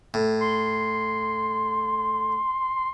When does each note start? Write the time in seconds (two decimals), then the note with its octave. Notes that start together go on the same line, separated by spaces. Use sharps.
0.14 A2
0.41 C6